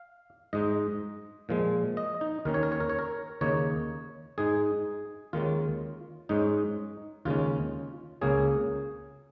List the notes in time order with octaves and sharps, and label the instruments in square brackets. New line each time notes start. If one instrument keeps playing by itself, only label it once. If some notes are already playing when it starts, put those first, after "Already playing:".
Already playing: [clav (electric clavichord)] F5
G#2 G#3 D#4 D#5
A#2 F3 G#3
D#5
D#4
D#2 D#3 C#4 A#4
C#5
A#4
C#5
A#4
C#5
A#4
D#2 C#3 A#3 D#4 C#5
G#2 G#3 D#4 G#4
D#2 D#3 G#3 C#4 F4
G#2 G#3 C#4 D#4
D#2 C#3 G#3 C#4 F4
C#2 C#3 A#3 C#4 G#4